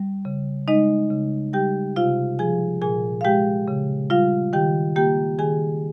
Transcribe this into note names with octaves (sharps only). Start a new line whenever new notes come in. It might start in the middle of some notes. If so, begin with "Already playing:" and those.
Already playing: G3
C#3
G#3 D#4 D#5
C#3
G3 G4 G5
C3 F4 F5
F3 G#4 G#5
A#2 G#4 G#5
F5
G#3 G4 G5
C#3
G3 F4 F5
D#3 G4 G5
A#3 G4 G5
D#3 G#4 G#5